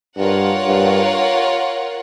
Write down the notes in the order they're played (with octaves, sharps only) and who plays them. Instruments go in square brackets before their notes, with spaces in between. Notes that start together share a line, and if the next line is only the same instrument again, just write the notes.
[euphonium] G2 [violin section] F4 A#4 C#5 F#5
[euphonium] G2